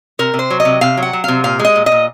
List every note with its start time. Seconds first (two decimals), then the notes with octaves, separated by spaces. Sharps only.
0.19 C3 A#4
0.34 C3
0.39 C5
0.50 F#3
0.60 D#5
0.65 C3
0.81 C3 F5
0.97 F#3
1.03 F#5
1.13 F#3
1.24 C3 F5
1.44 A#2 F5
1.59 G#3
1.65 D#5
1.76 A#2
1.86 D#5
1.92 A#2